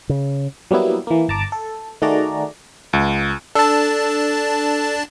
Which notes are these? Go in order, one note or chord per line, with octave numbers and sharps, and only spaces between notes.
C#3
F#3 G3 A#3 B3 E4
E3 A#3
G1 A5 A#5 D6
A4
D#3 A3 F#4 G#4 D5 A#5
C#2
D4 A4 A5 E6